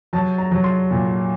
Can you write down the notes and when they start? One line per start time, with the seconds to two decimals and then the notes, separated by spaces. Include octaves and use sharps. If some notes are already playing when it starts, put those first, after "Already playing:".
0.13 F#3 A5
0.38 A#5
0.51 F#3
0.64 C6
0.91 A#2